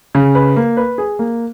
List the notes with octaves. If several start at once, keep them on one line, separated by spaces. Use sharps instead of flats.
C#3
B4
A#3
B4
G#4
A#3